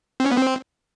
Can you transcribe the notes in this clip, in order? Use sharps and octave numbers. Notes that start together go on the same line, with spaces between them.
C4
C#4
B3
C4